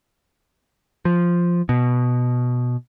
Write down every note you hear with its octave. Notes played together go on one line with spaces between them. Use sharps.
F3
B2